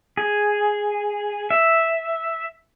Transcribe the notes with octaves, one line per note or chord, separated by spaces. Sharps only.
G#4
E5